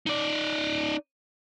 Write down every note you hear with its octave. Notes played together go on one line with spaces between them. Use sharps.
D#4 D5